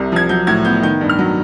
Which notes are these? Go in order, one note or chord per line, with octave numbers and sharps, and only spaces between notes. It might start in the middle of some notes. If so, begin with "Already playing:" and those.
Already playing: C2 C3
F3 G#6
F#3 G6
A2 G#6
B3 G6
D#3 G6
G2
F6
F#3